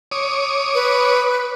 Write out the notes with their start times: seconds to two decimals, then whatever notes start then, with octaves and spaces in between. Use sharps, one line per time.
0.11 C#5 D6 D#6
0.74 B4